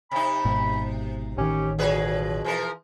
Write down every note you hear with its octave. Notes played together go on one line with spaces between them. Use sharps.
C3 D#4 B5
G#1 G#2 B2
A1 D#3 C#4 G4
F2 B2 F#3 G#4 B4
E3 F3 A#4